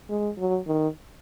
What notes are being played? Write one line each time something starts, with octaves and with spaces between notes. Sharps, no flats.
G#3
F#3
D#3